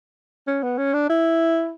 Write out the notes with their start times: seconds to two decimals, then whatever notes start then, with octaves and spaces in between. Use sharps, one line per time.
0.47 C#4
0.63 B3
0.78 C#4
0.94 D4
1.10 E4